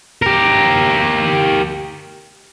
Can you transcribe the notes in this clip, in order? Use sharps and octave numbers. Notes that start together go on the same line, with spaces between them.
G4 A#4